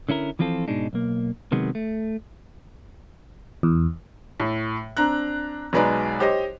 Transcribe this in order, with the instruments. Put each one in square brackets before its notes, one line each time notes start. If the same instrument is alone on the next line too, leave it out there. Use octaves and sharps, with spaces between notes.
[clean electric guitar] D3 C#4 E4 A#4
E3 F3 C4 F4 A4
G#2 B2 G#3 D4 D#4
B1 A#3
C3 D#3 F#3 G#3 B3
A3
[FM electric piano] E2
[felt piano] A2
C4 D4 A#5 F#6
B1 F#3 G#3 B4 D5 A#5
G4 C5 C#5 D#5